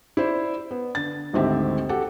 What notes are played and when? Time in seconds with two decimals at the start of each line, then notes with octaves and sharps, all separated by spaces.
0.17 E4 C5 D5
0.71 B3
0.95 D3 A6
1.33 G#1 D2 G#2 C4 G4 E5
1.89 F#4 G4 A4 F#5 G5